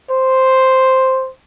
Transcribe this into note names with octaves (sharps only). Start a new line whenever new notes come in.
C5